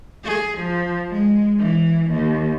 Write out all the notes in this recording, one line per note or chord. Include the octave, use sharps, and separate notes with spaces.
G#4
F3
G#3
E3
D#2